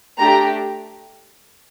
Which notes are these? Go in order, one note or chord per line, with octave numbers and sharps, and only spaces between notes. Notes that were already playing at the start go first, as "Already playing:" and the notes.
A3 D4 G4 A#5